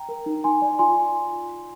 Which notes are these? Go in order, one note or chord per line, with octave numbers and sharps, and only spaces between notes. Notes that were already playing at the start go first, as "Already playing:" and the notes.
Already playing: G5 A#5
A#4
D#4
D#4 G#5 C6
D5
F4 G#5 C6